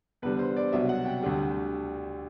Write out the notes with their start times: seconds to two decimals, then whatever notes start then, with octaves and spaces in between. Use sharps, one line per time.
0.22 E2 D3 G3 B4
0.39 C5
0.56 D5
0.72 C2 B2 F#3 E5
0.89 F#5
1.06 G5
1.22 D2 D3 G3